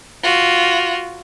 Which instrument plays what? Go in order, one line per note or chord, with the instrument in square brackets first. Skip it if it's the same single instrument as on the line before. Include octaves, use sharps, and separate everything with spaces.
[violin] F4 F#4